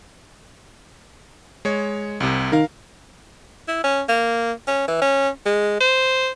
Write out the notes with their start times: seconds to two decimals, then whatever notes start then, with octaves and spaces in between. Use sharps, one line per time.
1.65 G#3 C#5
2.20 C2 C3
2.52 D#3 A#4 F5
3.68 E4
3.84 C#4
4.09 A#3
4.68 C#4
4.88 E3
5.02 C#4
5.46 G#3
5.81 C5